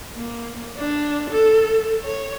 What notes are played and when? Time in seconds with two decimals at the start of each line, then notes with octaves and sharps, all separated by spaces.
0.16 A#3
0.77 D4
1.30 A4
2.03 C#5